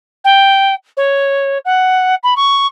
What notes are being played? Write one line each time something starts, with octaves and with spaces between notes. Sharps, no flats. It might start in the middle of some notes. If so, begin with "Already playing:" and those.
G5
C#5
F#5
B5
C#6